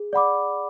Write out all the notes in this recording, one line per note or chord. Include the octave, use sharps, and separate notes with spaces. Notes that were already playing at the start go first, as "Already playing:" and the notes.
Already playing: G#4
D5 F#5 B5 D6